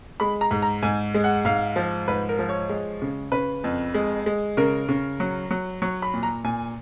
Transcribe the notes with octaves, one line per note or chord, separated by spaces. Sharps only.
G#3 B5
A#5
G#2
A#5
G#2 G#5
G#3
F#5
G#2 F5
F3
G#2 B4
A#4
F3
C#5
G#3
C#3
C#3 B4
F2
G#3
G#3
C#3 A#4
C#3
F#3
F#3
F#3 C#5
B5
A#2
A#5
A#2 G#5